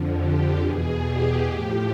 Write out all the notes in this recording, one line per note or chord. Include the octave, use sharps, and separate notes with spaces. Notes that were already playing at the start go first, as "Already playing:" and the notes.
Already playing: F2 D3 F3
G4
E2 B2 G#4
G4
A2 F3